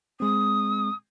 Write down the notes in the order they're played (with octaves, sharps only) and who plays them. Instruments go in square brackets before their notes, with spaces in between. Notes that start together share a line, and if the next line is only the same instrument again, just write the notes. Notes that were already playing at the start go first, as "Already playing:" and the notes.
[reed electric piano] G#3 C4 [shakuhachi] D#6